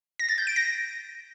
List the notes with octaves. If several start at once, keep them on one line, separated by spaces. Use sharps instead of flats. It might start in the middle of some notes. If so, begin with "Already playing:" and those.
A#6
A6
G6
D7
A#6